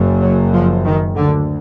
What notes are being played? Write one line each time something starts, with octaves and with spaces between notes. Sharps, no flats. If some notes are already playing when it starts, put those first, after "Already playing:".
Already playing: F#1 F#2
F#3
F3
D#3
D2 D3